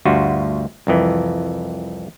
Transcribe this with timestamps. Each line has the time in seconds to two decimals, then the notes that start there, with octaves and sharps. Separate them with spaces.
0.05 D2 G2 F4 F#4
0.87 C2 F2 E3